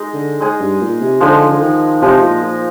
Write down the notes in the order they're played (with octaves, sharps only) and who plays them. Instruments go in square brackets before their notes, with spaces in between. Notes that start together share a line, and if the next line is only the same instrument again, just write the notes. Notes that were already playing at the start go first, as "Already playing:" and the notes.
Already playing: [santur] G#3 D#4 G#4 D#5
[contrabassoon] D3
[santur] G#3 D#4 G#4 D#5
[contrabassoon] G2
A#2
C3
[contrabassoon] D3 [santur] F3 G#3 D#4
[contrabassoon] D3
D#3
[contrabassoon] C3 [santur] F3 G#3 D#4
[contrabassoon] A#2
A#2